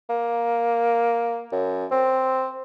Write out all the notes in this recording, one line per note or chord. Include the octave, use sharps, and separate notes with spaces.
A#3
F#2
C4